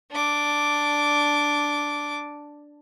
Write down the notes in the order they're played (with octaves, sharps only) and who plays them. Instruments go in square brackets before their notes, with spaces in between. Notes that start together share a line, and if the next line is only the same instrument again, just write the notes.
[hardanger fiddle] D4 D6